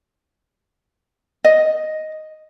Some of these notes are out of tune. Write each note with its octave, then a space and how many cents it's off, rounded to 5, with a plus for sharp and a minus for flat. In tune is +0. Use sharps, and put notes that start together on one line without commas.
D#5 +0